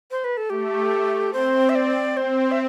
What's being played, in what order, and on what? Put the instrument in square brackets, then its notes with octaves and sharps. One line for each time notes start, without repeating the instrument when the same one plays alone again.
[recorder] C5
B4
A4
[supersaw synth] A3 [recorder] G4
[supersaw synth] C4 [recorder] C5
[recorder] E5
D5
[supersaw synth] C4 [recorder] C5
[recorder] E5